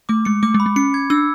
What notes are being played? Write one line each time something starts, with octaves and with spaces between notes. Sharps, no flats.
A3 D6
G#3 C#7
A3 D6
G#3
B5
G#3
C#4 C#7
G#6
D4 E6